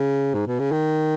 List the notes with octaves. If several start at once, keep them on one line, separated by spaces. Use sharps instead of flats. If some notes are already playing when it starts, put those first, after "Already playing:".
Already playing: C#3
G#2
B2
C#3
D#3